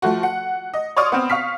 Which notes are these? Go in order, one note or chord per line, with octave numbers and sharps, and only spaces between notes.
F3 A3 F#4
F#5
D#5
C#5 D5 C6 C#6 D#6 F6
B3 C4
F5 C#6 F6 B6